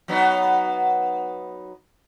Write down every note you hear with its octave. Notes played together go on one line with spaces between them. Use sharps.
F#3 B3 D#4